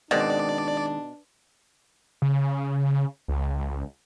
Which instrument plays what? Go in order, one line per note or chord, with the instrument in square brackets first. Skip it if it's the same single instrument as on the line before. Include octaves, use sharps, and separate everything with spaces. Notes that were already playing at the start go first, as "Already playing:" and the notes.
[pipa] B2 [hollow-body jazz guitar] D#3 G#3 C4 [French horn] D4 [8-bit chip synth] D5
[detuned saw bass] C#3
C#2